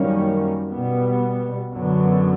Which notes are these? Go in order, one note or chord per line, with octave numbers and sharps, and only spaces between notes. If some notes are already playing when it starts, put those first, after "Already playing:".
Already playing: F#2 D#3 G3 A#3 C#4
B2 G3 B3
F#2 D3 F#3 B3